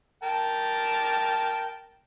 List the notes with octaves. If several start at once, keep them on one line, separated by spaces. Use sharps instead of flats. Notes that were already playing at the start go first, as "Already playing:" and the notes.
A#4 G5 A5